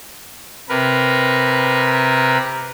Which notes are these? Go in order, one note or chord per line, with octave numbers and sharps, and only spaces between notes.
C3 A#4 B4